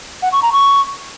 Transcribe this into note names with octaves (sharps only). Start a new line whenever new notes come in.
F#5
C#6
A#5
C#6